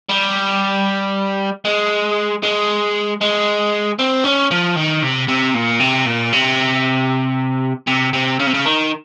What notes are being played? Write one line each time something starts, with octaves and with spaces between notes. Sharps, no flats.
G3
G#3
G#3
G#3
C4
C#4
F3
D#3
C3
C3
A#2
C3
A#2
C3
C3
C3
C#3
C3
C#3
D#3